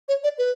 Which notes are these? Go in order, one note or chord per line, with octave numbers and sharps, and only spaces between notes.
C#5
D5
B4